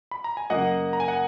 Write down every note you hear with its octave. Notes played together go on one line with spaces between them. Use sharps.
B5
A#5
G#5
F#2 C#3 F#3 A#3 D#5 F#5
A#5
G#5
F#5